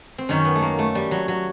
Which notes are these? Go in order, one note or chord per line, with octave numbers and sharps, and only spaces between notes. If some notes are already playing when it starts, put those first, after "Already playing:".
C4
F#2 D#3 C#4
B3
A3
A#3
A3
G3
F#3
F#3